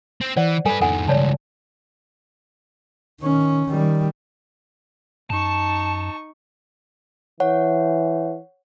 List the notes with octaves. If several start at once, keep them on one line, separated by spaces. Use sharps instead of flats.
C4
E3 C5 D5 F#5
G3 A4 B4 G#5
F2 D#3 A4 F#5 G#5
C#2 G2 C#5 D5 A5
D#3 C#4
D#3 G3
F#2 D#4 A5 C#6
E3 C#5 F#5